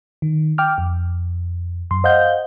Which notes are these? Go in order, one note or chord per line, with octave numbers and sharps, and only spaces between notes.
D#3
G5 D6 F6
F2
F#2 C6
C5 D#5 F5 F#5 G6